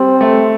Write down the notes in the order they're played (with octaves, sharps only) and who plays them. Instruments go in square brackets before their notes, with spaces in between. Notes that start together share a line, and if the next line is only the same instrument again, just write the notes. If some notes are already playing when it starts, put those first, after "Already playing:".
Already playing: [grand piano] G3 [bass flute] C4
[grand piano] A3